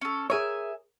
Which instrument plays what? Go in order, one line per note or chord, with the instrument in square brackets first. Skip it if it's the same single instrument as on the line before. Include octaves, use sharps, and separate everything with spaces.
[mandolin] C#4 A4
[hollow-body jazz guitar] G#4 A#4 C#5 [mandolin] E5 G#5